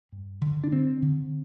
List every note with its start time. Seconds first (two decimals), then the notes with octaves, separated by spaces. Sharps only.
0.12 G2
0.41 D3
0.64 D4
0.72 D3 C4
1.02 D3